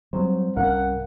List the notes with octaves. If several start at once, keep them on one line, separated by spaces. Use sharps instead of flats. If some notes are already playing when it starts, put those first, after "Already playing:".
G2 F#3 G3 C4 C5
C2 G2 C#4 A#4 F5 F#5